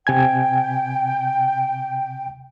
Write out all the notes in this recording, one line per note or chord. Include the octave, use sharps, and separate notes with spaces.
C3 G5 G#5 G#6